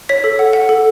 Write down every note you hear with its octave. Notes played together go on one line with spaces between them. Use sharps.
C#5 B6
A4
F#5
F#5
A4